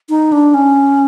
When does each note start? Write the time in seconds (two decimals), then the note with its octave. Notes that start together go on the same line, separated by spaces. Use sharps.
0.09 D#4
0.32 D4
0.54 C#4